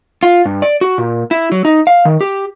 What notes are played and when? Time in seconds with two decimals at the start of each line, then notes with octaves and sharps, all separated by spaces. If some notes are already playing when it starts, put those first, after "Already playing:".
0.23 F4
0.45 G2
0.62 D5
0.81 F#4
0.98 A#2
1.31 E4
1.52 F#3
1.65 D#4
1.87 F5
2.05 D#3
2.21 G4